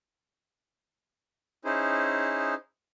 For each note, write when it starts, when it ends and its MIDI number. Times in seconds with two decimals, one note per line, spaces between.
1.65 2.54 61
1.65 2.54 63
1.65 2.54 64
1.65 2.54 68
1.65 2.54 72